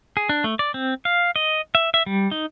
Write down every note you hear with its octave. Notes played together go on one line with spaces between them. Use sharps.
G#4
D4
A3
D5
C4
F5
D#5
E5
E5
G3
D#4